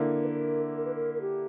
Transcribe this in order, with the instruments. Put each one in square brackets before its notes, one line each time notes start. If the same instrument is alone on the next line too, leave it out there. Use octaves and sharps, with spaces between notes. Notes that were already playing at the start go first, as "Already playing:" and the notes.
Already playing: [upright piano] D3 A#3 E4
[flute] B4
A#4
A#4
B4
A#4
A#4
G4